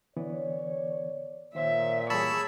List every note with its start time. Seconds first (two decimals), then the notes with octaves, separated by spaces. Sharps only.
0.17 D3 E3 B3 C#5 D5
1.55 A#2 D#3 C5 C#5 E5
2.10 E3 G3 G#4 C#5 A5 B5 E6